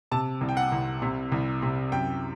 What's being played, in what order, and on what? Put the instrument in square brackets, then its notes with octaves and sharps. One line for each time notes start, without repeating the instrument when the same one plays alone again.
[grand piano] C3 A5
C2
G5
F#5
C2
C3
C2
C3
F#2 G5